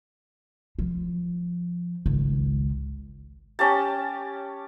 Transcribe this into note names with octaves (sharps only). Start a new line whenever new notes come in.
F3
G#1 C#2
C#4 G4 A5